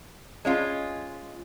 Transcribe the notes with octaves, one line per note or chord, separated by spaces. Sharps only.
G#3 C#4 F4